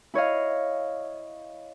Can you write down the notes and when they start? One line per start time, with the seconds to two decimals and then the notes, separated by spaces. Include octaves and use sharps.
0.14 E4 C#5 D#5 F5